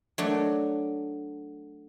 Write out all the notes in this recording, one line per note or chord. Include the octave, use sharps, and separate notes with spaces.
F#3 A3 D4